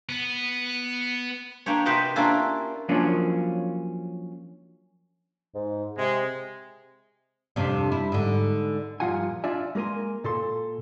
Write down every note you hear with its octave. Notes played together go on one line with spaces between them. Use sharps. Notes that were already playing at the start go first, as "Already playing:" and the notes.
B3
A#3 D4 G4 C#5
C3 G4 B4 C5 D#5 F#5
A#3 C#4 D4 E4 F4
F3 F#3 A#3 C#4 D4
G#2
C3 G#3
F2 C3 D4
E4
G#2 D3
G2 A#2 F3 F4 F#5 G#5
D4 F4 D5 E5 G#5
G#3 A#3 A#4 G#5 C6
A#2 A4 C6